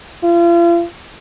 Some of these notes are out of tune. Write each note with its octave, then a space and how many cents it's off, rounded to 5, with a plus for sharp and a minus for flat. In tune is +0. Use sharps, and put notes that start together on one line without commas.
F4 -40